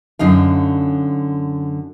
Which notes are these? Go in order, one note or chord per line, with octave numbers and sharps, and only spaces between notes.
F#2 D3 D#4 F5